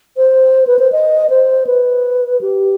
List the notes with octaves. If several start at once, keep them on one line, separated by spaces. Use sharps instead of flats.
C5
B4
C5
D#5
C5
B4
G4